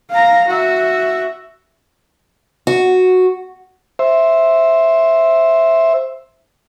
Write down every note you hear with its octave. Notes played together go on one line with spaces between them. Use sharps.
F5 A#5
F#4 E5
F#4
C5 E5